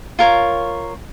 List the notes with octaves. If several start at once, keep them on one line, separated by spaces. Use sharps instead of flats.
F4 A#4 C#5